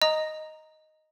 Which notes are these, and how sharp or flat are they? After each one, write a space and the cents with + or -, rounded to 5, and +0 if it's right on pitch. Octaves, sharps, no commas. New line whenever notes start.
D#5 +0 A#5 +0 D#6 +0